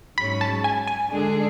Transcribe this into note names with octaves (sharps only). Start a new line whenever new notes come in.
G#2 F#3 C#4 B5
A5
G#5
G#5
D3 G#3 D4 G#4